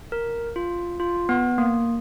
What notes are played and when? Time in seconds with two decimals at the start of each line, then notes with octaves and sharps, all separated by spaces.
0.12 A#4
0.56 F4
1.00 F4
1.29 B3
1.58 A#3